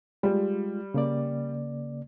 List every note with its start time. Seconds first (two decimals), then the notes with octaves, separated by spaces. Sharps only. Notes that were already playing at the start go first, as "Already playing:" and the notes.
0.23 G3 G#3 F4
0.94 C#3 A#3 D5